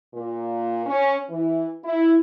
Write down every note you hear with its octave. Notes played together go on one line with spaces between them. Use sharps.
A#2
C#4
E3
E4